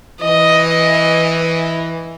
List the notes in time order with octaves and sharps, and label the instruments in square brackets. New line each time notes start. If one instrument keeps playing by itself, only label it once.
[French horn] E3 [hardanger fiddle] D#5